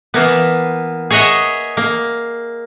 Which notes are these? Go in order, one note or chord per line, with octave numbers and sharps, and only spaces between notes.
E3 A#3 B3
G#4 C#5 D#5 E5 F#5 A#5
A#3